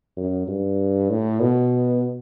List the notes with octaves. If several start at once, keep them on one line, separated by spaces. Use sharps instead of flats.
F#2
G2
A2
B2